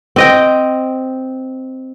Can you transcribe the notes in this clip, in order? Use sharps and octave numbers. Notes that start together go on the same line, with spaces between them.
C4 D#5 G5